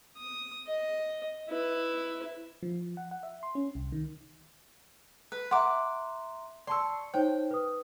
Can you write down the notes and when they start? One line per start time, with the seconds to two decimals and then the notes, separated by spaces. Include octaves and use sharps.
0.18 D#6
0.67 D#5
1.49 E4 B4
2.62 F3
2.97 F#5
3.11 F#5
3.23 E5
3.43 C6
3.55 C#4
3.75 C2
3.92 D#3
5.32 B4
5.51 E5 F#5 A#5 C6 D6
6.67 D5 A5 C6 C#6 E6
7.14 D#4 C5 C#5 G5
7.51 B4 D#6